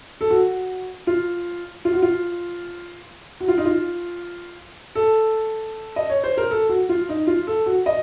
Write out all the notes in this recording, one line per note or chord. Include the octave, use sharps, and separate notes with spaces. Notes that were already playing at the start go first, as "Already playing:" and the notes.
A4
F#4
F4
F4
F#4
F4
F#4
F4
D#4
F4
A4
D#5
C#5
C5
A#4
A4
F#4
F4
D#4
F4
A4
F#4
D#5